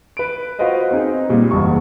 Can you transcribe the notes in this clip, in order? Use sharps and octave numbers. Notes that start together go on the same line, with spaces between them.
B4 D7
F4 F#4 B4 C5 D#5 F5
C4 D#4 G#4
A#2 G3 G#3
F#1 E2 G2 C#6